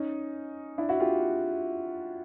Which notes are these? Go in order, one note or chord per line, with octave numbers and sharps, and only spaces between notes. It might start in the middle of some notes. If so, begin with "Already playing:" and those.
Already playing: C#4 D#4
D4 E4
E4 F#4
F4 G4